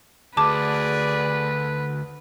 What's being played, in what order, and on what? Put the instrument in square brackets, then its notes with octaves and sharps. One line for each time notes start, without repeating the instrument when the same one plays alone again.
[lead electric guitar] D2 [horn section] G#4 D5 [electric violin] B4 [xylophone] A5 D6